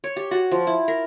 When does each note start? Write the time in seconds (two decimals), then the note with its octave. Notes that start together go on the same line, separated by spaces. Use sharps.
0.04 C#5
0.16 G4
0.31 F#4
0.51 F3
0.67 E4
0.88 A#4